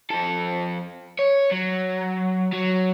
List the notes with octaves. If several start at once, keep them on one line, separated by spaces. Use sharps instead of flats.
F2 A4
C#5
F#3
F#3